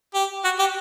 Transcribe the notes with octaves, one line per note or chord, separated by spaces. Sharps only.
G4
F#4
G4